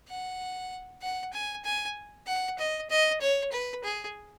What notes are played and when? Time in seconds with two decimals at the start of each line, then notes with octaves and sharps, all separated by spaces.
0.09 F#5
1.02 F#5
1.34 G#5
1.65 G#5
2.27 F#5
2.59 D#5
2.90 D#5
3.21 C#5
3.52 B4
3.84 G#4